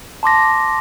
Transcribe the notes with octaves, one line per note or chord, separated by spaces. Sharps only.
A5 C6 D6 A#6